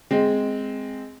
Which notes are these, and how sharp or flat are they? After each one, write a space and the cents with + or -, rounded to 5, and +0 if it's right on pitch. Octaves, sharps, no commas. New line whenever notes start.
G#3 +0 C4 -5